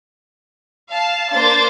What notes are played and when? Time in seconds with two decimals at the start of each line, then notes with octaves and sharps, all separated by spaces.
0.90 F5 A5
1.31 A#3 D4 C5 A6